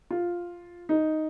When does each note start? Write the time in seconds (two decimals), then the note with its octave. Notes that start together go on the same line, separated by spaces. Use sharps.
0.11 F4
0.89 D#4